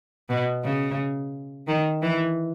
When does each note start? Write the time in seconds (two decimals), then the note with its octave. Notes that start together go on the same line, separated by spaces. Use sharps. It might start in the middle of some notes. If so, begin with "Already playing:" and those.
0.29 B2
0.64 C#3
1.68 D#3
2.02 E3